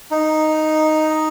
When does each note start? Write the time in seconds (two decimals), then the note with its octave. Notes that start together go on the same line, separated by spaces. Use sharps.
0.11 D#4